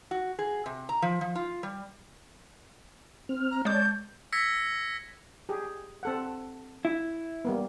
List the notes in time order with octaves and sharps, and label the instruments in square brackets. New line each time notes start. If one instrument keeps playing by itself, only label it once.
[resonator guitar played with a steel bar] F#4
G#4
C3
A#5
F3
F3
F4
G3
[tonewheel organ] C4 F6
[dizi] A#5
[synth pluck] G#3 D6 [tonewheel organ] C#5 D5 A5 [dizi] G6
[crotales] E6 G#6 A#6 B6 C#7
[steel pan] G4 G#4
C4 A4 F#5
[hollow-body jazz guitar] E4
[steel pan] G3 A#3 B3